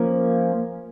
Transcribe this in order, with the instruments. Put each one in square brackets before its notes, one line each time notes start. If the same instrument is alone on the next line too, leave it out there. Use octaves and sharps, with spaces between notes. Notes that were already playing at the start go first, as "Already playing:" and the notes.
Already playing: [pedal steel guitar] F3 A#3 C#4